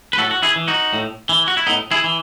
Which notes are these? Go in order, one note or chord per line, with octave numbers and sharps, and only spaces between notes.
B4
A2 F#4 A4
F#4
E4 G#4
E3
D#4 F#4
A2
E3
F#4
E4
A2 B3 D#4
E4 G#4
E3